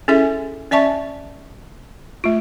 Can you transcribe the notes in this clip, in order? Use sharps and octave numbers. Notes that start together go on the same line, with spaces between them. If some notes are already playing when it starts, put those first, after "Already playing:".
C#4 E4 G#4 A4 E5 G#5
C#4 D5 E5 A5 C#6
A3 F4